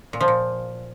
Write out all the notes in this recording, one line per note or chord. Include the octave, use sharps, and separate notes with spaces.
A#2
F3
A#2